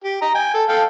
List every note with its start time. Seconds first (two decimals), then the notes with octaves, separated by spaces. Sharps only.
0.04 G4
0.22 D#5 A#5
0.35 G5 G#5
0.54 A4
0.69 A4 F5 G5